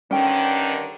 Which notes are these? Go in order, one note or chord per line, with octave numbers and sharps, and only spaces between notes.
G2 D3 D#3 C#4 G5